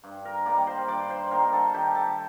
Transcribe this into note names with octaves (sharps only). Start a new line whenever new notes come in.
G2
A#4 A#5
D#3 G3 A#3 D5 D6
C5 C6
G2 D5 D6
C5 C6
D#3 G3 A#3 A#4 A#5
A4 A5
D#3 G4 G5
A4 A5